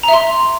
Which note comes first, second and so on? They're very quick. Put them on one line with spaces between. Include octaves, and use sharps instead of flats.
A#5 E5 C6